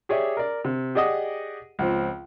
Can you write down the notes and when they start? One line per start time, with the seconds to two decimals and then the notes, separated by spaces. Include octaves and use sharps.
0.09 G4 G#4 C#5 D5 E5
0.37 A#4 D5
0.65 C3
0.95 G4 G#4 D5 D#5 F#5 D#6
1.79 C#2 F3 C4